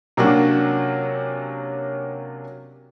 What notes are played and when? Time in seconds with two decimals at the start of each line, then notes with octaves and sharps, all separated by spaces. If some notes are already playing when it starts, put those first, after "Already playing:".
0.17 C3 F#3 A#3 C#4 D4 F#4